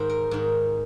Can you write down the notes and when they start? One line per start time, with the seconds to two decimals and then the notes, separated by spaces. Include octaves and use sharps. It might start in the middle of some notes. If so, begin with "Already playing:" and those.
Already playing: G#2 D#3 C5
0.10 A#4
0.31 G#2 D#3